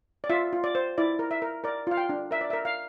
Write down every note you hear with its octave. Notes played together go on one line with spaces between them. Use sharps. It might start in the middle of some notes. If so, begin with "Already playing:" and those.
D5
F4 E5
F4
D5
C5
E4 D5
A#4
E5
A#4
A#4 D5
F4 F5
G5
D4
A#4 E5
D5
E5
A#4
F5